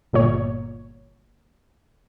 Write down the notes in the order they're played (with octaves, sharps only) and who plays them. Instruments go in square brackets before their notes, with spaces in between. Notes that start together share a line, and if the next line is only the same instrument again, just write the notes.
[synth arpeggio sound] G1 A#2 C#5